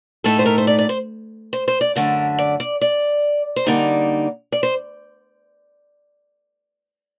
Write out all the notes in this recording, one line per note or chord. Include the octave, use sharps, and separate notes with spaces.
A2 A3 D#4 A4
C5
A#4
C5
D5
D5
C5
C5
C5
D5
F#2 D3 A3 A#4
D5
D5
D5
C5
D3 G3 A#3 D#4 D5
D5
C5